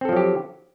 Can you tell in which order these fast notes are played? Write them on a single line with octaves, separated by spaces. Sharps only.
C4 A4 F3 F#3 G4